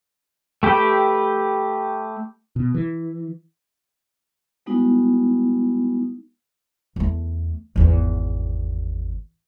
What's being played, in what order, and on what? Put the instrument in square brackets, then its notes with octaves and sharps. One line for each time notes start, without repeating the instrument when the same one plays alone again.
[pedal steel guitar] A3 G4 B4 G5
[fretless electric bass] B2
E3
[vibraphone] G3 G#3 B3 D#4 E4 F#4
[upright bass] E2 A3
G#1 E2